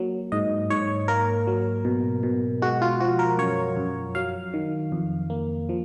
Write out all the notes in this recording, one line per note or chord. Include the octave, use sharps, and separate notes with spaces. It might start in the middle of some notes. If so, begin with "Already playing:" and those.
Already playing: F#3 A#3
G#2 D#5
G#2 C#5
A#3 A#4
F#3
B2
B2
G#3 F#4
F4
F3 F#4
A#4
F#2 C#5
F#2
F#3 F5
D#3
F2
A#3
F3